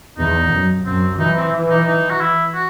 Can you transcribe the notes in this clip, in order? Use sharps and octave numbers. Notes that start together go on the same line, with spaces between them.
E2 D#4
F#2
F#2 C4
E3 D#4
C4
D#4
D#4
F#4
E4
F#4